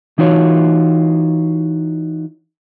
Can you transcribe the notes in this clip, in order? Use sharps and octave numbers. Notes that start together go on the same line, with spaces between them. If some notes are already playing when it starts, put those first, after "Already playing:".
E3 D#4 F4 F#4 C#5